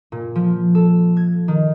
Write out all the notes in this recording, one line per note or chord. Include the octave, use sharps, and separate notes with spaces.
A#2
F3
A4
G#6
D#3